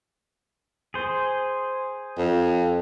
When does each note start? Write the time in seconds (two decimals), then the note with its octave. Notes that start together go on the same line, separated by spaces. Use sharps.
0.94 G#4 C5
2.17 F2